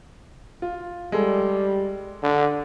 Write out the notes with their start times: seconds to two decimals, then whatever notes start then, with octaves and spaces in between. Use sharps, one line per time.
0.62 F4
1.12 G3 G#3 A4
2.23 D3